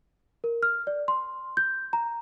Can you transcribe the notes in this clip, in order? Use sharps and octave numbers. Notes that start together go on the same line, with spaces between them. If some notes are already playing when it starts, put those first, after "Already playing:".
A#4
F6
D5
C6
G6
A#5